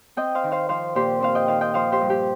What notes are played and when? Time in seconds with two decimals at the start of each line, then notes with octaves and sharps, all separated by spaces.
0.17 C4 D#5 G5
0.35 C5 F5
0.44 D#3
0.52 C5 F5
0.69 F3 C5 F5
0.95 A#2 G4 C5
1.20 C4 C5 F5
1.35 D#5 G5
1.48 D#3 C5 F5
1.61 D#5 G5
1.74 F3 C5 F5
1.92 G4 C5
2.01 G2
2.10 G4